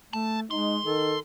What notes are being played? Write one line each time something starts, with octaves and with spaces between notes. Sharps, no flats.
A3 A5
G#3 D#4 C6
D#3 A4